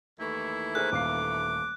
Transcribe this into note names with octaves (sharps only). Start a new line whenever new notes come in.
D#2 E3 A3 E4
G#4 A#4 C5 F#6
D#1 F5 D6 C7